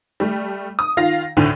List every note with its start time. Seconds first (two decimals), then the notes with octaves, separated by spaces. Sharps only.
0.20 G3 A3
0.79 D#6
0.97 D#3 F4 F5 A#6
1.37 D2 A2 D3 D#7